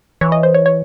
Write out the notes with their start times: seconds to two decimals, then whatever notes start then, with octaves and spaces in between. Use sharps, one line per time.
0.21 E3 C#5
0.32 D#5
0.43 C5
0.54 C#5
0.66 C#5